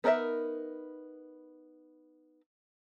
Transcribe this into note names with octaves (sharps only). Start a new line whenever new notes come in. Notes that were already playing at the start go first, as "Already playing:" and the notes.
B3 D#4 A#4 D#5 E5